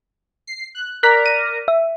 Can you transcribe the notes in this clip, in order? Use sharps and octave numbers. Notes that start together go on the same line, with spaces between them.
C7
F#6
A#4 D5 A#5 F#6 B6
D#7
E5